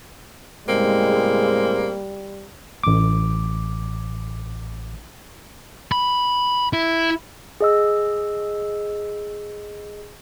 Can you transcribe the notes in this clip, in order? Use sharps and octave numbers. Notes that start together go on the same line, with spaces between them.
A2 C#3 G3 G#3 A#3 C4
A1 D6
B5
E4
G#4 D#5 E6